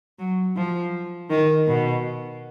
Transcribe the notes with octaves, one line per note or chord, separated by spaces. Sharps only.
F#3
F3
D#3
B2